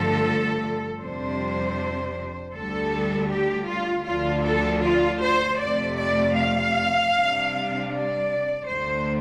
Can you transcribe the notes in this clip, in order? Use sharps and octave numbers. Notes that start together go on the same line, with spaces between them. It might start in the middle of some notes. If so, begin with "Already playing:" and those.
Already playing: G2 D3 F3 A3 A4
F2 C3 G3 D4 C5
D2 D3 G3 D4 A4
G4
F4
D2 D3 F3 D4 F4
A4
F4
C5
F2 C3 A3 D5
D5
F5
C3 G3 D4
D5
D2 D3 A3 D4 C5